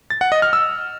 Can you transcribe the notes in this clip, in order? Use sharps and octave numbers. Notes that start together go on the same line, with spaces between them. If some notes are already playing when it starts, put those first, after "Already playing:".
A6
F#5
D#5
F6
E6